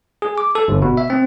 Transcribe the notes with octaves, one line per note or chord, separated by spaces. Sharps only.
G#4
D6
A4
G1
B2
E5
C4